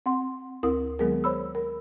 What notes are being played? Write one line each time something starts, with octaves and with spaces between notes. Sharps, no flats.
C4 F#5 C6
D2 C4 E4 A#4 D#6
D#3 F#3 G#3 B3 G#4 A#4
C5 C#5 B5 E6
A#4